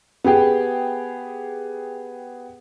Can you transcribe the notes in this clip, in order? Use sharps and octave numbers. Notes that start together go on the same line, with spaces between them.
B3 G4 G#4 G5